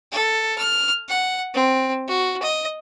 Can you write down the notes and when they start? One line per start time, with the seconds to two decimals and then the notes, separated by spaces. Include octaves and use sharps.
0.12 A4
0.58 F6
1.09 F#5
1.54 C4
2.08 F#4
2.43 D#5